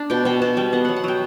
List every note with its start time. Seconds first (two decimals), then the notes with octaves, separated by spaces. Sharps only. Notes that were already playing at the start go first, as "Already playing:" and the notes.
Already playing: D4
0.10 B2 G5
0.25 B2 G5
0.42 B2 A5
0.57 G3 G5
0.73 B3 F#5
0.85 F#3 F#5
0.96 F#5
1.04 F#3 G5